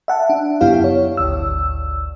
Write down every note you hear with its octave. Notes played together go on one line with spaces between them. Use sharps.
E5 F#5 A5
D4
F#2 C#3 B3 E4 G4 F5
C#5
G#1 D2 E6